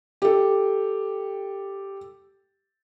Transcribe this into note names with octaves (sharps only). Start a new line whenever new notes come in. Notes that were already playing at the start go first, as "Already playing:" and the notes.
G4 A4